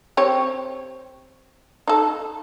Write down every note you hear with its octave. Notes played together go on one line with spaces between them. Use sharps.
C4 G4 C#5
D#4 A4